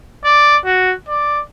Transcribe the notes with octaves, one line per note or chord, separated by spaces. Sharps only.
D5
F#4
D5